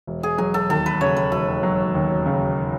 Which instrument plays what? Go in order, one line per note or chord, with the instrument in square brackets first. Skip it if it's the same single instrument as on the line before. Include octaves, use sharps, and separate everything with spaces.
[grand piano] E1
[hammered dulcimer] G#4
[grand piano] F#3 [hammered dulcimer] G#4
[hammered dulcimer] A4
[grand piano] D#2 [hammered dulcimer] A4
[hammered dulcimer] B4
[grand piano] C#3 [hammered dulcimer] C#5
[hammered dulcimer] B4
[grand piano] E1 [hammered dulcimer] A4
[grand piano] F#3
D#2
C#3